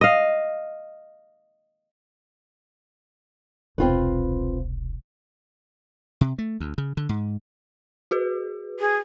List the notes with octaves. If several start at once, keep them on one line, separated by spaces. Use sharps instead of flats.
D#5 F5
E1 C2 C4 F4 B4
C3
A3
D2
C#3
D3
G#2
F#4 G#4 B4
G#4